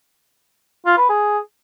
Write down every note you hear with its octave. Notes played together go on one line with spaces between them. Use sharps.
F4
B4
G#4